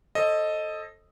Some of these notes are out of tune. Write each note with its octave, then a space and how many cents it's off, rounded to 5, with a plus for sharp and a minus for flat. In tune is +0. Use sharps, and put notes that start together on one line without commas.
A4 +0 C5 +45 D#5 +0